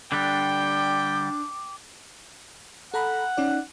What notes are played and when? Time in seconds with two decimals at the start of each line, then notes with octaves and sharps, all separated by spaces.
0.12 D3 G3 D4 G5 D6 F#6
2.94 A4 F#5 A#5 B5
3.37 C#4 D#4 D5